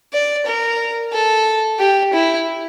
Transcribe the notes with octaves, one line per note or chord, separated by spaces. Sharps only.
D5
A#4
A4
G4
E4